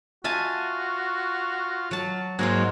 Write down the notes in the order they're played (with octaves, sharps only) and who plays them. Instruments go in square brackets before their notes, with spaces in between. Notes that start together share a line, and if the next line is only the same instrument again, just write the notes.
[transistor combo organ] F4 [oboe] F#4 [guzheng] E5 G#5 A5
[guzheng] F#3 A5
[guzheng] G#2 D#4 F4 [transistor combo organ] F#3 A#3 G#4